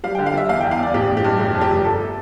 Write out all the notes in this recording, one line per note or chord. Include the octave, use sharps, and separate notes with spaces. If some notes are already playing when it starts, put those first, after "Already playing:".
G3 F5
G5
D3
F5
G3 E5
E2 F5
G5
E2
F5
E2 D5
A1 G4
A1
G4
G2
F1 G4
F2
G4
F1
G1 A4